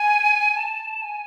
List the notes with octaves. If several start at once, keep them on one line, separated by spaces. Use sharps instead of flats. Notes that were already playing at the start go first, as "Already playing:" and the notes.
Already playing: G#5
A5
G#5